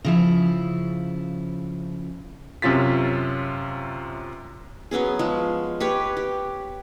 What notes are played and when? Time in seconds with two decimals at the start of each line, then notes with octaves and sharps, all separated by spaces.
0.05 C#3 F3 E4
2.62 F#2 C3 C#4 F4 A6 B6
4.91 F#3 B3 C#4 G#4
5.19 F3 G#3
5.80 G4 B4 C#5
6.17 G4